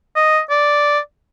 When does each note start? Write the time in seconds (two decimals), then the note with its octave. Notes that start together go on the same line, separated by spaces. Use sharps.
0.16 D#5
0.50 D5